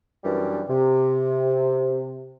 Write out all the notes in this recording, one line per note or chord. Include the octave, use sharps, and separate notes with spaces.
F#2 E3 G3 D4
C3